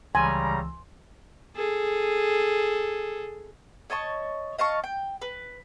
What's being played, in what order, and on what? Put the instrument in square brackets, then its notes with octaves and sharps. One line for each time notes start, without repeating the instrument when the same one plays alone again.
[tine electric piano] C#2 E3 E6 [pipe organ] C#3 G3 A#5 [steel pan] G#5 [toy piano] C6
[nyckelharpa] G#4 A4
[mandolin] C#5 D#5 A5 C#6
D#5 F5 A5 C#6
G5
B4